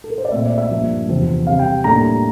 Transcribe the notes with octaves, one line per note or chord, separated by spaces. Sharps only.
A4
A#4
C5
D5
A#2 A3 C4 E5
D5
E5
G2 F3 A#3 D4
E2 C3 F3 C4
C3 G3 C4 F5
G5
A2 G3 A#3 D4 A#5